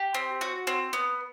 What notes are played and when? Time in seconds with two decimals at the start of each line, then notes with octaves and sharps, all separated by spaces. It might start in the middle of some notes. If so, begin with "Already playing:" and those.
Already playing: G4
0.14 C4
0.41 F#4
0.67 C4
0.93 B3